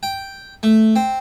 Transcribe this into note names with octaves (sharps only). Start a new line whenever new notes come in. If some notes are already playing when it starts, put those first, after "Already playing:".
G5
A3
C4